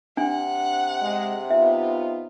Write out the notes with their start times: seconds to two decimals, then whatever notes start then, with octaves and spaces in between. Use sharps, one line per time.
0.17 C3 D4 F#5 G#5
1.02 G#3 D#5
1.50 B3 D#4 F4 E5